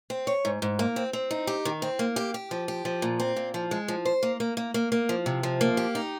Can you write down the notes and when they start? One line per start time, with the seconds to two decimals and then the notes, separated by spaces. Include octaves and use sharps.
0.10 C4
0.27 C#5
0.45 G#2
0.62 G#2
0.79 A#3
0.96 C4
1.13 C4
1.31 D#4
1.47 G4
1.65 D#3
1.82 C4
1.99 A#3
2.16 G4
2.34 G4
2.51 F3
2.68 G4
2.85 F3
3.02 A#2
3.20 C4
3.36 A#2
3.54 F3
3.71 G#3
3.88 F3
4.05 C5
4.23 A#3
4.40 A#3
4.57 A#3
4.74 A#3
4.92 A#3
5.09 F3
5.26 C3
5.43 F3
5.61 A#3
5.77 G4
5.95 D#4